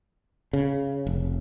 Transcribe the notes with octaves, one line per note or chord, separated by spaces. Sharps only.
C#3
F1